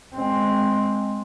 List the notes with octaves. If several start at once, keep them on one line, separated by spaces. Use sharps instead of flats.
G#3 C4